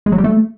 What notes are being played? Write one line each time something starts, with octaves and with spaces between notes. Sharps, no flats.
G#3
F#3
G3
A3